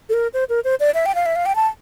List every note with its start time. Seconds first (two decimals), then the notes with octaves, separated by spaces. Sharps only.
0.09 A4
0.13 A#4
0.34 C5
0.49 A#4
0.64 C5
0.80 D5
0.94 E5
1.06 G5
1.15 F5
1.26 E5
1.36 F5
1.46 G5
1.55 A5